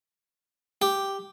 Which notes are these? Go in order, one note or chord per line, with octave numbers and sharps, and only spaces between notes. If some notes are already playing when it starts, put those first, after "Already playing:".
G4